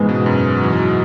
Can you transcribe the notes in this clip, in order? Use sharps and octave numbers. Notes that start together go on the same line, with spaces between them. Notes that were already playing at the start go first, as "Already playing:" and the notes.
Already playing: G#2 C#3 E3 G#3 B3 G#4
B2
F#2
F#3
E3
F#3